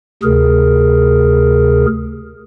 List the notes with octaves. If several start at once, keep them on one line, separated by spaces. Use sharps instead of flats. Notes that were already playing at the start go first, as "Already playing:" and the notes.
D2 C3 G#4 A#4